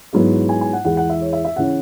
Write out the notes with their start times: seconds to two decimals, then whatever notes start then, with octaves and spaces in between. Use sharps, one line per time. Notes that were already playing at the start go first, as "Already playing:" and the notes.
0.13 G#2 F#3 B3 E4
0.49 G#5
0.61 G#5
0.73 F#5
0.85 E2 E3 G#3 E4 F#5
0.97 F#5
1.10 E5
1.21 C#5
1.33 E5
1.45 E5
1.56 C#3 E3 C#4 E4 F#5